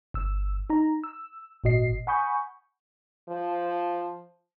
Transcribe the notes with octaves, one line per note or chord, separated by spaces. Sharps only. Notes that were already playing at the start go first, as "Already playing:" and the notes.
G1 E6
D#4 A#5
E6
G#1 A#2 F#4 D#5 C7
F#5 G#5 B5 C#6 D#6 G6
F3